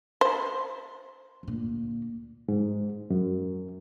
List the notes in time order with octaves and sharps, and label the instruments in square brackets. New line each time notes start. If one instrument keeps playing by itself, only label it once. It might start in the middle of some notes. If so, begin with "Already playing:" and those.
[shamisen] C5
[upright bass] D2 A#2
[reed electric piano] G#2
F#2